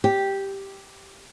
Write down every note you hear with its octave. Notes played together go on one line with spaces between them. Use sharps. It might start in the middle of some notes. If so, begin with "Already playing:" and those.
G4